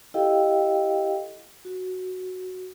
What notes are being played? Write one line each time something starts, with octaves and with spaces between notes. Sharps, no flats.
E4 G4 A4 D#5 F5 G5
F#4